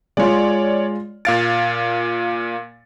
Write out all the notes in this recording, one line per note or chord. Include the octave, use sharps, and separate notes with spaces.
G#3 F4 C#5 D5
A#2 F5 A6 D7